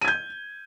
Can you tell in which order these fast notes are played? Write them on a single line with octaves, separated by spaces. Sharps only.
D#7 G#6 G6